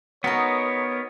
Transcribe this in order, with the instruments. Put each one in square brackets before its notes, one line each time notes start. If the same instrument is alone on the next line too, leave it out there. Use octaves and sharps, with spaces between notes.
[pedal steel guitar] B3 A#4 [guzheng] D#4 F#4 [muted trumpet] C#5